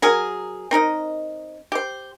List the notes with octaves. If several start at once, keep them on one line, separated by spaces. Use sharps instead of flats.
F#3 G#4 A#4
C4 D#4 A#4 D#5
G4 C5